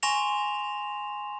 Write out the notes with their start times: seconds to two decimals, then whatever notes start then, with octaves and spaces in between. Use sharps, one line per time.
0.03 G#5 C6 C#6 A#6 E7 F7